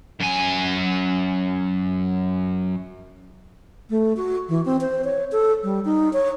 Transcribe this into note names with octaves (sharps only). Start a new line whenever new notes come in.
F#2 G#5
A3
F#4
E3
C4
C5
C#5
A4
G3
D#4
C#5